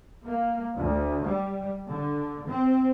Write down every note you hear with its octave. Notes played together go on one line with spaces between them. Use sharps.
A#3
D2
G3
D3
C4